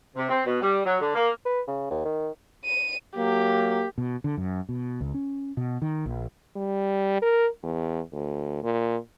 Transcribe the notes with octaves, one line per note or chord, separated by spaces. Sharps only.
C3
C4
B2
G3
F#3
D3
A#3
B4
C#3
D#2
D#3
D#7
F#3 A#3 G4
B2
D3
F#2
B2
C#2
C#4
B2
D#3
A#1
G3
A#4
E2
D2
A#2